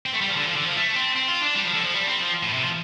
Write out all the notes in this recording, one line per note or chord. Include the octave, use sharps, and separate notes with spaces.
C4
A3
G3
F3
D3
F3
D3
F3
A3
C4
C4
F4
D4
G3
F3
D3
F3
G3
C4
F3
A2
C3
F3